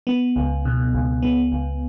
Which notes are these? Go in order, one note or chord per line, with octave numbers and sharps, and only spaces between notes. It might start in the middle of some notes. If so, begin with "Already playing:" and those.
B3
C#2
B2
C#2
B3
C#2